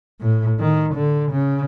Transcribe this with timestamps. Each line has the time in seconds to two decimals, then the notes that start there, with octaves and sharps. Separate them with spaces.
0.20 A2
0.60 D#3
0.94 D3
1.31 C#3